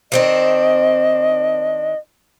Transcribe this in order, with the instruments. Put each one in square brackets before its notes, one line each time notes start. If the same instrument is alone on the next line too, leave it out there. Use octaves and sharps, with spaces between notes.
[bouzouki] D#3 C4 D4 [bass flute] D#5